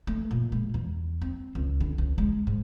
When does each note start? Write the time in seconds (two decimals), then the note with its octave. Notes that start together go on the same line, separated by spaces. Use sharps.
0.07 A3
0.31 A#2
0.52 G#3
0.74 E2
1.22 C4
1.55 C#2
1.80 D3
1.98 C#2
2.18 G#3
2.47 G#2